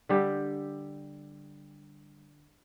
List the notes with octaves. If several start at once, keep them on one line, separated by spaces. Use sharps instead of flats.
D3 G3 G4